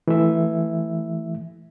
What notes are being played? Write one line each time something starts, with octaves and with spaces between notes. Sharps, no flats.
E3 A3 E5